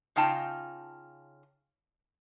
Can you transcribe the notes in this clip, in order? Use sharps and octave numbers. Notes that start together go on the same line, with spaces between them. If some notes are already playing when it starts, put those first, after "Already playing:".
C#3 D#4 F4 G5 A5